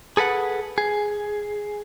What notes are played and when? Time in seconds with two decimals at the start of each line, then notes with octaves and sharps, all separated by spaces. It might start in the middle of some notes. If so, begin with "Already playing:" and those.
0.17 G#4 A4 B4 F#5
0.78 G#4